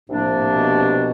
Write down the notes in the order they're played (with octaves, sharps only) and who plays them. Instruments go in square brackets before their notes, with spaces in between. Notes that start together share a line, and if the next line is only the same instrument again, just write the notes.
[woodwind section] C2 C3 F3 A#3 D4 [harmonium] A2
[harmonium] A#2
A2
B2